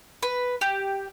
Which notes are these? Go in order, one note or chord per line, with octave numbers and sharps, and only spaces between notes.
B4
G4